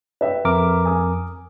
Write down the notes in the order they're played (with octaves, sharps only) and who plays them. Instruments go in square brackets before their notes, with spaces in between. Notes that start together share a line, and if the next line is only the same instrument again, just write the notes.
[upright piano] B4 E5 G5
[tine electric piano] F2 A#4 D6
[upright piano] G#5 D#6